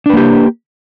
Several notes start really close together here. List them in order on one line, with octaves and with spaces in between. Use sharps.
D4 B4 A#3 G4